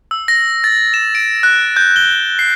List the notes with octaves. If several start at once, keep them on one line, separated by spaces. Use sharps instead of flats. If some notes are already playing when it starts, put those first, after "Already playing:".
E6
A#6
A6
E7
D7
F#6
G6
G7
C7